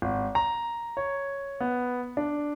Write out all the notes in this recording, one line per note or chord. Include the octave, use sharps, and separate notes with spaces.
G#1
A#5
C#5
B3
D4